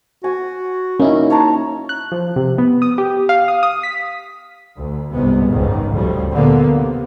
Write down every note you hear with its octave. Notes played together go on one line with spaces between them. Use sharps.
F#4 G#5
A#3 C#4 D#4 E4
C#5 A5 A#5
F#6
F3
C3
B3
D#6
G4
F5
D#6
D#6
B6
D2
G1 C2 G#2 C3 G#3 B3
F#1 C#2 G#2 D#3
D2 A2 C#3 F3 G3
A#2 D3 A#3 B3
C3